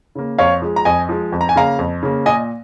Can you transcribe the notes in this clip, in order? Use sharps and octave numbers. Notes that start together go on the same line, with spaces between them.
C#3 A#3
F2 C#5 F5
F3 G#3
A#5
F2 D#5 G#5
F3 G#3
F2
A#5
G#5
C#3 A#3 F5 A#5
F2
C#3 A#3
A#2 D#5 G#5